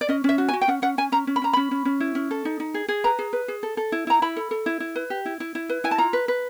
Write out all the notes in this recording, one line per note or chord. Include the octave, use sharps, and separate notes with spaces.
D5
C#4 D#5
C#4 E5
F#4
G#5
F#4
G5
C#4 F#5
C#4 F#5
C#4 G#5
C#4 A#5
C#4
B5
C#4 A#5
C#4 B5
C#4
C#4
E4
C#4
A4
D#4
D#4
G#4
G#4
B4 A#5
G#4
B4
G#4
A4
A4
E4
E4 A#5
E4 B5
A4
A4
E4
E4
B4
G4
E4
E4
E4
B4
E4 G#5
A5
F4 A#5
B4
B4